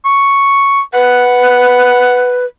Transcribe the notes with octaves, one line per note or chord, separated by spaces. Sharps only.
C#6
B4 F#5